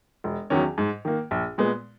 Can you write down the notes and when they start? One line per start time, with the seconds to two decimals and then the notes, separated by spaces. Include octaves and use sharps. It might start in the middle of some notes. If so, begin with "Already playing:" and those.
0.24 E1
0.50 E2 D#3 F#3 C#4
0.78 G#2
1.05 D#3 A#3
1.31 A#1
1.58 A#2 G#3 B3